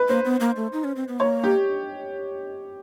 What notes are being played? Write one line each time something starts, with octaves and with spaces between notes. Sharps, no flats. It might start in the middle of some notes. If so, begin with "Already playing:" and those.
Already playing: B4
A#3 C5
B3
A#3
A3
D#4
C#4
C4
B3
A#3 C#5
G4